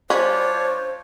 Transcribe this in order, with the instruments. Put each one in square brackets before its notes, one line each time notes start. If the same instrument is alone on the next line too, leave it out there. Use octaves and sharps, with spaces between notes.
[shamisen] G3 C#4 [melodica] D4 F4 C#5 [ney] C5